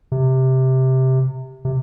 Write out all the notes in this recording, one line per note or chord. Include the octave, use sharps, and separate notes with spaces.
C3
C3